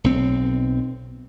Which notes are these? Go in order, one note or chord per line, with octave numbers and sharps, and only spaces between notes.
B1 C4